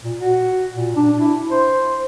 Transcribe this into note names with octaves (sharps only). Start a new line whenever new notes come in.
A#2
F#4
A#2
D4
E4
C5